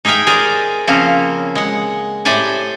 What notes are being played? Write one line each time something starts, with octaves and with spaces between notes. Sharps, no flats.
D#4 G#4 E5 F5 G5
G#4 A#4 C5 D5
C#3 F3 A#3 C4 C#4
G#3 F#5
A2 G4 C5 D5 G#5